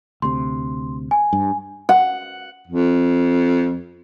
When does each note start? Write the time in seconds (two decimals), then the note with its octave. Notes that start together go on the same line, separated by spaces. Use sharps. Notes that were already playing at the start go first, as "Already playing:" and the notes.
0.22 D2 C3 C6
1.11 G#5
1.33 G2
1.89 F#5
2.67 F2